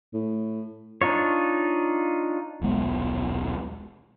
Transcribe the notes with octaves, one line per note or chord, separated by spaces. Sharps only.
A2
D4 D#4 F4 C#5
D#1 B1 G#3 B3